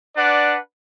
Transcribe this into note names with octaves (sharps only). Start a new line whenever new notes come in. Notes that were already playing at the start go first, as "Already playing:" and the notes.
D4 B4 D5 F#5